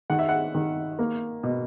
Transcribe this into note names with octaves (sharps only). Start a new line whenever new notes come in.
D#3 F#5
E5
F#5
D#3
A#3
B2